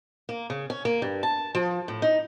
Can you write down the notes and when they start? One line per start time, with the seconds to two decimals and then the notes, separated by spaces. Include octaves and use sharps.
0.29 A#3
0.50 C#3
0.70 C#4
0.85 A#3
1.02 G2
1.23 A5
1.55 F3
1.88 A2
2.02 D#4